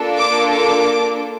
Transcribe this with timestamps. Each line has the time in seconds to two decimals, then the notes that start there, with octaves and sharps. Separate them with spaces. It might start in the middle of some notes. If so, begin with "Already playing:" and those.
Already playing: A#3 D4 F4 A4
0.17 D6
0.51 D6